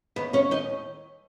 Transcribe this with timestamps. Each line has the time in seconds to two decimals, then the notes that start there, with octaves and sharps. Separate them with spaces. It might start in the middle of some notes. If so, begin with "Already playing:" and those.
0.16 D#2 B3 B4
0.33 C#4 C#5
0.51 D#2 D#4 D#5